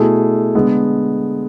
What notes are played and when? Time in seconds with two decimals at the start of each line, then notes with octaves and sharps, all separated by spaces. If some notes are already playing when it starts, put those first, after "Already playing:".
Already playing: B2 A3 E4 G#4
0.55 D3 G#3 B3